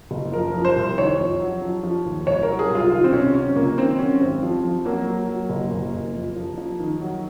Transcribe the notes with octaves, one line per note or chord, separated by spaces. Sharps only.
F#1
F3 A#4
F3
C5
C2
D#3 C#5
F2
F#3
F3
F3
D#2
C2 C#5
A#4
F#3
G#4
C2
F4
D#3 F4
C4
C3 C#4
F#3 C#4
C#2 A#3
D#3 C4
F#3 C#4
G#1 C4
F3
F3
F#3 A#3
F#3
F#3
F#1
F#1
F#1
F2
F3
F3
D#3
F#3